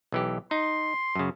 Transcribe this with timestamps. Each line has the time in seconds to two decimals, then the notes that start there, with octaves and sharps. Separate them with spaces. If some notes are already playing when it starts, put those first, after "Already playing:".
0.12 B1 E3 G4
0.51 D#4 C6
1.15 F#2 C#3